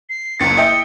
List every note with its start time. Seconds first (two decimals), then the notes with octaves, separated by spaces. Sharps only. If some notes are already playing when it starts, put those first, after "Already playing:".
0.10 C7
0.40 F#1 C#2 A6 C#7
0.57 E4 D#5 G5